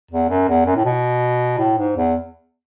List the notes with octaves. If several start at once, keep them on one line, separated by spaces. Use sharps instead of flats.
E2
F#2
E2
F#2
A2
B2
A2
G#2
E2